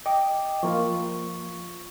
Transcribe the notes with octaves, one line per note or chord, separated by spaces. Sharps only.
D#5 G5 D6
F3 A#3 F4 C#6